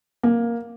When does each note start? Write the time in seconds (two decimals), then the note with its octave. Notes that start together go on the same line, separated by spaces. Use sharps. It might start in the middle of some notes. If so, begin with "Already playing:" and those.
0.23 A#3